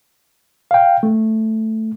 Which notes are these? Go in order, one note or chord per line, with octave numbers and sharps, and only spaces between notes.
F5 G5
A3